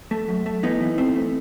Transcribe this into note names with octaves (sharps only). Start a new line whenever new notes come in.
A3
F#2
A3
E3 B3 D#4
E3
A3 C4
A3